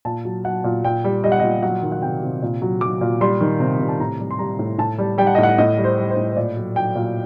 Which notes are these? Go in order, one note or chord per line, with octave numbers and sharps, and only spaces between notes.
A#2 A5
F#3
F#3 F#5
A#2
A#2 G5
G3
G3 D#5
F#5
A#2 D#5
F#3 F#5
D#3
F#5
C3 G5
C3
A#2
F#3
F#3 D6
A#2
G3 C6
D#3
C3
C3
A5
A2 A#5
G3
C6
G3 A#5
A2
A2 A5
G3
G3 G5
F#5
A2 D#5
F#5
A2 D#5
G3
C5
G3
C5
A2
C5
A#2 D5
F#3
F#3 G5
A#2